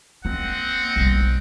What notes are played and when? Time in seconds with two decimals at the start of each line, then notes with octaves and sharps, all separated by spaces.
0.25 A#3 C4 D#5 F#5
0.96 B1 G3